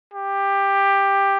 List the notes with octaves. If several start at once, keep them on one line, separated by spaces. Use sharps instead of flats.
G4